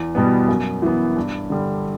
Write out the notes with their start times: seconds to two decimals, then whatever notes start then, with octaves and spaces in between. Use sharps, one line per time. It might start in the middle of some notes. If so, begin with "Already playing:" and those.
Already playing: E2
0.15 B2 G3 B3
0.48 F#2
0.82 E3 B3
1.17 G2
1.50 D3 G3